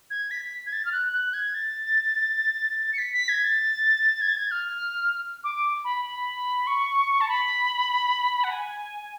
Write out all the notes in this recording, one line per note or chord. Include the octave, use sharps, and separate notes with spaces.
G#6
B6
G#6
A6
F6
F#6
F#6
G#6
A6
C#7
B6
B6
G#6
A6
G#6
A6
G#6
F6
D6
B5
B5
C#6
A5
B5
F#5
G#5